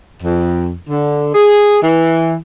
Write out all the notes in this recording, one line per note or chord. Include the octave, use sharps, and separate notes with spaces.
F2
D3
G#4
E3